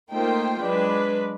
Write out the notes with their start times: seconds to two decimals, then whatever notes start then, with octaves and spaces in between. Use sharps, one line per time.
0.12 A3 A#3 D#4 F4 C5 G5
0.61 F#3 G#3 D4 B4